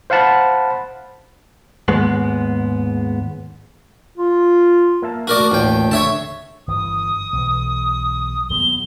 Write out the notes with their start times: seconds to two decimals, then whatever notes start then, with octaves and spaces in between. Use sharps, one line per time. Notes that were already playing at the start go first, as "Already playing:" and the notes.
0.10 C5 F5 F#5 A5 B5
1.88 D#2 G#2 G#3 B3
4.17 F4
5.02 A#3 E5 A5
5.27 A3 F#4 A#4 D5
5.51 A1 D#2 F4 D5 G5
5.91 D3 C#5 E5 A5
6.67 G1 E3 D#6
7.33 B1 E3
8.50 D#1 F#3 B3 G7